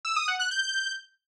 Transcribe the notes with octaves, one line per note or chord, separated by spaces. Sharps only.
E6
D#6
F#5
F#6
G6